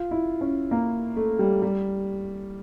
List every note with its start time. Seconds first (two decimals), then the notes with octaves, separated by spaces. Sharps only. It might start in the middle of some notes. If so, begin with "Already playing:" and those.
Already playing: F4
0.11 E4
0.41 C#4
0.71 A#3
1.16 A3
1.39 G3
1.62 G3